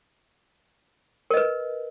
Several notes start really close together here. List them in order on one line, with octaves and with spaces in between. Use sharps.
A#4 D#5 B4